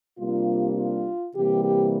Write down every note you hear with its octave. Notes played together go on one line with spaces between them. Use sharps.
C3 G3 A#3 D4 F4
F4
C3 E3 G3 A#3 G4
G4